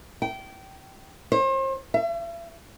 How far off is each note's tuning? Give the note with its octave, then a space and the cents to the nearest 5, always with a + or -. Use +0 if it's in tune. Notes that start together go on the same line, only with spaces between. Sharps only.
G5 -25
C5 +40
E5 +45